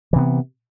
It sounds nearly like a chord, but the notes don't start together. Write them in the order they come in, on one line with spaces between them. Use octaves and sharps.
E3 C3 B3